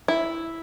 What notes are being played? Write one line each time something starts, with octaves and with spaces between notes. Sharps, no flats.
E4